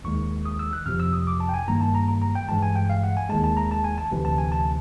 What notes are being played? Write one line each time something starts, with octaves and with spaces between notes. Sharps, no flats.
D#2 D#3 G#3 C#6
D#6
E6
F#6
F2 C3 F3 F6
E6
D#6
D6
A5
G5
G#5
G2 D#3 G3 A#3 A#5
A5
A#5
A#5
A#5
G5
G2 E3 G#3 A5
G#5
G5
F5
F#5
G#5
D#2 D#3 G#3 A5
A5
A#5
A5
G#5
A5
D2 C3 E3
A5
G#5
A5